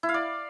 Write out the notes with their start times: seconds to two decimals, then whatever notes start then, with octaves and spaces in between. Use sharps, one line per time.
0.03 E4
0.09 F5
0.14 D5